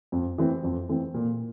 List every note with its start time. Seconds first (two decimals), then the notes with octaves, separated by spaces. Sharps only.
0.12 F2
0.38 E3 A3 C4
0.63 F2
0.89 E3 A3 C4
1.14 A#2